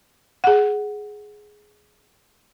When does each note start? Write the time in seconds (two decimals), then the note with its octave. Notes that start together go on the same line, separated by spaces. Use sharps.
0.44 G#4 F#5